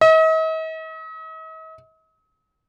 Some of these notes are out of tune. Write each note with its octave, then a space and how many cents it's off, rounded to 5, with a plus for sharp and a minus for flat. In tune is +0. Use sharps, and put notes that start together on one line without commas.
D#5 +45